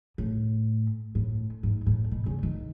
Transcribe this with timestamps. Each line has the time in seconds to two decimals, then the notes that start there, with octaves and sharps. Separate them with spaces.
0.18 A2
1.15 A2
1.63 G#2
1.86 A2
2.11 B2
2.26 C#3
2.43 D#3